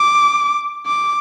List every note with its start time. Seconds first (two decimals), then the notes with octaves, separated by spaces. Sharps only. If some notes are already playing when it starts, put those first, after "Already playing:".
Already playing: D6
0.86 D6